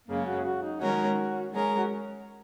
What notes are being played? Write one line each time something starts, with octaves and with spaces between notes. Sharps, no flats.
F#2 C#3 G#3 A#3 C#4
F#4
F#4
D#4
D#3 G#3 C#4 F#4 A#4 C#5
G#3 C#4 G#4 A#4
F#4